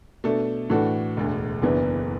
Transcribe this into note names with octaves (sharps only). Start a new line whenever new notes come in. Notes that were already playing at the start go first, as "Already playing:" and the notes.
B2 A3 D4 A4
A2 E3 D4 F#4 A4
E1 D2 D3
F#1 E2 E3 B3 D4